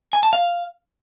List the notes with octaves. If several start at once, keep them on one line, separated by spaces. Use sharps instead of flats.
G#5
A5
F5